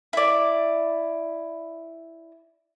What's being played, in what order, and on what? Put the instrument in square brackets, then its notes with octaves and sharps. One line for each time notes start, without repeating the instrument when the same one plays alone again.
[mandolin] E4 D5